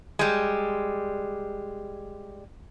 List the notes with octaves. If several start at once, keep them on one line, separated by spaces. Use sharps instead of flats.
G3 G#3